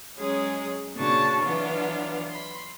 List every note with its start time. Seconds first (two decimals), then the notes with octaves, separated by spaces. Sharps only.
0.17 F#3 G#3 C#4 G#4
0.97 A#2 C#3 D4 F#4 A5 C#6
1.42 E3 F#3 B3 D4 F4
2.29 B5 C6